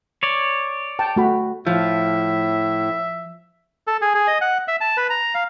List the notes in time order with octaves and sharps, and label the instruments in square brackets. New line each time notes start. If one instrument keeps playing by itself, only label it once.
[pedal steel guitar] C#5 D5
[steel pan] G5 A5
A3 F#4 B5
[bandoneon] A2 [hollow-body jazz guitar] F3 [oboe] E5
[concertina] A4
G#4
G#4
D#5
F#5
E5
A5
B4
A#5
F5